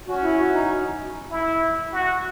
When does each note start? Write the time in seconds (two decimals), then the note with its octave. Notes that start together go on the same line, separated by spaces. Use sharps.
0.08 C#4 F#4
0.24 E4
0.39 F#4
0.54 D#4
1.31 E4
1.92 F#4